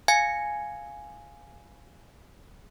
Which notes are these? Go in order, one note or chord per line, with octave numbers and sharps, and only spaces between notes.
F5 G#5 G#6 C#7